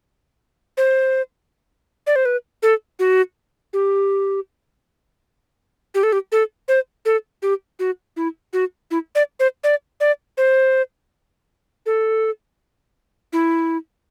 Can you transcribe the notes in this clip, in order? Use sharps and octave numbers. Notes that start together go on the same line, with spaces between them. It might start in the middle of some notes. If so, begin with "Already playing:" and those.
C5
D5
C5
B4
A4
F#4
G4
G4
A4
G4
A4
C5
A4
G4
F#4
E4
F#4
E4
D5
C5
D5
D5
C5
A4
E4